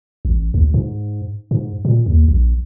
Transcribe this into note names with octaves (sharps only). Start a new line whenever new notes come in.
A1
D2
G#2
G#2
A#2
D#2
A#1